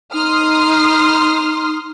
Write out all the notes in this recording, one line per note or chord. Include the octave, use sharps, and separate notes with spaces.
D#4 C6 D#6 F6